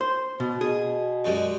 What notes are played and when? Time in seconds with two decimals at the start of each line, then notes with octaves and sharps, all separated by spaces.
0.01 C5
0.40 B2
0.61 B2 G#4
1.24 F#2 G3 G#3